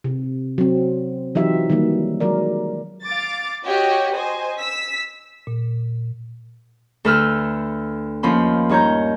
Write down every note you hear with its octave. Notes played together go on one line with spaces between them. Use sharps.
C3
F#3 C4
E3 F#3 D#4 F4 G4 E5
D#3 F#3 G3 A#3
F#3 G#3 A#4 D5
F5 D6 A6
F#4 G4 C#5 D#5
C5 D#5 G#5
E6 B6
A#2
D2 A4 B4 E6 F6 G6
D#2 F3 C#4 B5 C6
G2 D#4 C#5 A#5 G6